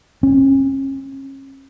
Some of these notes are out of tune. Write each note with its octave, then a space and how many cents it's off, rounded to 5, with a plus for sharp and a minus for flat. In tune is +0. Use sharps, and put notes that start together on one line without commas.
C#4 -35